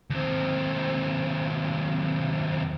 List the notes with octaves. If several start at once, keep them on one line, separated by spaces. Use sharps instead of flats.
D#2 C4